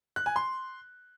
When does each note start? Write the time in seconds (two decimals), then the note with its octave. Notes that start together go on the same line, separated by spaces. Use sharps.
0.16 F#6
0.26 G#5
0.36 C6